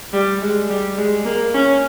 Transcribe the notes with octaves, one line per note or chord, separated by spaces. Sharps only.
G3
G#3
G3
G#3
A#3
C#4